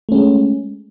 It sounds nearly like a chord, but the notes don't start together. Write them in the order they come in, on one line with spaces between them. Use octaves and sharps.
A3 C#4 G#3